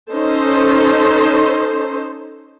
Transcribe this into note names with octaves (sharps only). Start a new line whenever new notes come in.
C#4 D#4 A4 C5